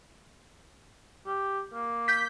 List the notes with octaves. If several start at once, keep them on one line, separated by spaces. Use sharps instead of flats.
G4
A#3
G6 B6